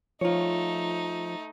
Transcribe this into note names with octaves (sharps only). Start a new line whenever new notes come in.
F3 A3 D#4 F4 C#5